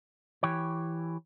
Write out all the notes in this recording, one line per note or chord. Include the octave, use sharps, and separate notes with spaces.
E3 G4 C#5